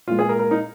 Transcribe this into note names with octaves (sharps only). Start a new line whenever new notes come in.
A#2 G#3 F4
G#4
A#4
A#4
D#4